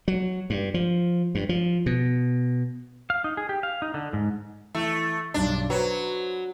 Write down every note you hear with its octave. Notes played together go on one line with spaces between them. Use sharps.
F#3
G2
F3
G2
F3
B2
F5
D#4
G#4
G4
F5
D#4
D3
G#2
E3 A3
B1 G2 D4
F#3 B4 C5